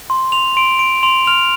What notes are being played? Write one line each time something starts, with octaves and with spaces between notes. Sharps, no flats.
C6
C6 F7
C6 D7
C6 D7
C6 F7
F6 F7